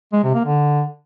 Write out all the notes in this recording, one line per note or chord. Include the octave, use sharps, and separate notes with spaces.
G#3
C3
A#3
D3